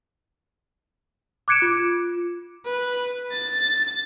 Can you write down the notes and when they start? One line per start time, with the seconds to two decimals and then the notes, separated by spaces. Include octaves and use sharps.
1.48 D6 F#6 G#6 C#7 D7 E7
1.62 F4
2.65 B4
3.32 A6